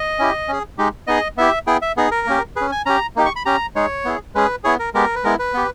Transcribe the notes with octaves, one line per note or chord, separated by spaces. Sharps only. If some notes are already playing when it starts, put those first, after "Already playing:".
Already playing: D#5
C#4 E4 G4
C#4 G#4
G#3 D#4 G4
B3 D#4 G#4 D#5
B3 E4 G4 E5
B3 E4 G#4 G5
E5
B3 D#4 G#4
A#4
A#3 C#4 G4
C#4 G#4 B4
G#5
C#4 G4 A#5
A#3 D#4 G4
C#6
B5
C#4 G4 A#5
G#3 D#4 G#4 C#5
B3 E4 G#4
G#3 C#4 G#4 B4
B3 E4 G#4 C#5
A#4
G#3 B3 G4 A#4
B4
G#3 B3 E4 A#4
B4
B3 G4